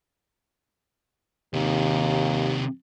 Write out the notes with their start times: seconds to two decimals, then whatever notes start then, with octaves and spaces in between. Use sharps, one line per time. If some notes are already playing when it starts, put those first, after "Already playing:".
1.54 D#2 C3 D#3